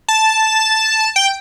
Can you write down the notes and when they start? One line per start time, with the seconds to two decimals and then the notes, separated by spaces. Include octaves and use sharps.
0.08 A5
1.16 G5